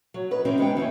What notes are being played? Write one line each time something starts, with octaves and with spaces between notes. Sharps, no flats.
F#3
D#4 B4
E3 C4 C#4 D#4 G4 C5
G#3 B3 D#4 G5
D#2 E3 C4 C#4